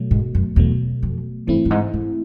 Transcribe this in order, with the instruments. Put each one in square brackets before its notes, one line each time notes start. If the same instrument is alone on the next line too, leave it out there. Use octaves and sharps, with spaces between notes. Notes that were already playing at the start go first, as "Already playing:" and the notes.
Already playing: [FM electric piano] B2 F#3 A3
[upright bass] G#2
F#2
[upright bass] E2 [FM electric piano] B2 F#3 A3
[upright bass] F2
[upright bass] G2 [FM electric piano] E3 A3 C4 E4
[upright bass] G2
G#2
G#2